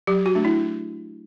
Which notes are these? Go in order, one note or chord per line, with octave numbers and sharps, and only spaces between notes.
F#3 G4
F#4
A3 D4
E4